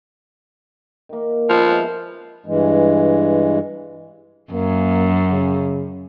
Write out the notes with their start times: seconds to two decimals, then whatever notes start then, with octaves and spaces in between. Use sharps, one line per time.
1.09 D#3 A#3
1.49 B2 F3
1.67 G#3 E4 G#4
2.46 G2 E3 G#3
4.53 F#2 A#3
5.30 C#3